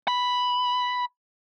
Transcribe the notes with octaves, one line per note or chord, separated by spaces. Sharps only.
B5